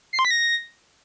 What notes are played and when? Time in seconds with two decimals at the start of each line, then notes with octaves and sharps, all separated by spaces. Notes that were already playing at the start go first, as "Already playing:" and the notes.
0.13 C7
0.19 C6
0.25 B6
0.31 A#6